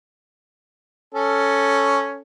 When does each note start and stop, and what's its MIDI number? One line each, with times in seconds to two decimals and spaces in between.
1.14 2.21 61
1.14 2.21 69